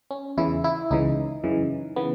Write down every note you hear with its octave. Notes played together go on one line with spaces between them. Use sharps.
C#4
E2 C#3 E3 E4
E4
C#2 C#3 E3 D#4
F#2 C#3 E3
C#3 E3 B3